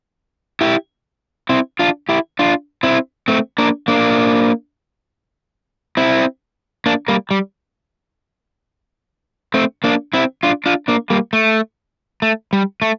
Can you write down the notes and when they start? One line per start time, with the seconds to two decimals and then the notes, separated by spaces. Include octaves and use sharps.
0.61 E4 G4
1.49 C4 E4
1.79 D4 F4
2.09 E4 G4
2.39 D4 F4
2.83 C4 E4
3.28 A3 C4
3.58 A#3 D4
3.88 A#3 D4
5.97 C4 E4
6.86 A#3 D4
7.08 G3 A#3
7.31 G3
9.54 A3 C4
9.84 A#3 D4
10.13 C4 E4
10.43 D4 F4
10.66 D4 F4
10.88 A#3 D4
11.10 G3 A#3
11.33 A3
12.22 A3
12.53 G3
12.82 A3